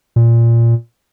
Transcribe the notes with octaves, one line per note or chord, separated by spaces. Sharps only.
A#2